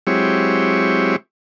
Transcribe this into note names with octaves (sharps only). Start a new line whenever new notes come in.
F#3 G#3 C4 E4 G4 C#5